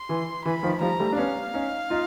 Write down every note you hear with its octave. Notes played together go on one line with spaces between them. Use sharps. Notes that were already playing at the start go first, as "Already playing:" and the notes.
Already playing: C6
E3
E3 B5
D#3 F3
F3 G3 A#5
G3 A3
D4
B3 C#4 F5
C#4 D#4
D#4 F4